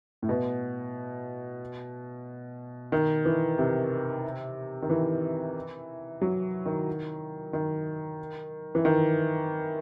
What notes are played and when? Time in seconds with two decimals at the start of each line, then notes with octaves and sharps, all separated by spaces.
0.22 A2
0.29 B2
2.92 D#3
3.25 E3
3.58 C3
4.82 D#3
4.90 E3
6.22 F#3
6.66 D#3
7.53 D#3
8.75 E3
8.85 D#3